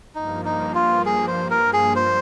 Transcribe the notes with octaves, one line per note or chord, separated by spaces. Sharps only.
G2 F3 A#3 D#4
D#4
F4
G#4
C5
A#4
G#4
C5